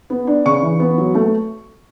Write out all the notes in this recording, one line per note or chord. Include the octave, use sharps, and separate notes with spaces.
B3
D4
C#3 C#6
E3
B3
F#3
A3